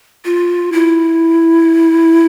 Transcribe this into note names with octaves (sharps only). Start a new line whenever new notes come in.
F4
E4